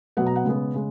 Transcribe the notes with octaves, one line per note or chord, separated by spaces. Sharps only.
B2 F#3 B3 F#5
A#5
F#5
C#3 G#3 B3
C#3 G#3